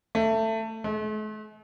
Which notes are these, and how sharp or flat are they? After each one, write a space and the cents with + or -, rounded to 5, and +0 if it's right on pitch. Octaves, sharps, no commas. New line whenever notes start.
A3 +20
A3 -45